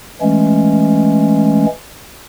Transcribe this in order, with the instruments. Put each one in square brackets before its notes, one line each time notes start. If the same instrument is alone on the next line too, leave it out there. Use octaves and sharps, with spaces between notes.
[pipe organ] E3 G#3 A3 C#4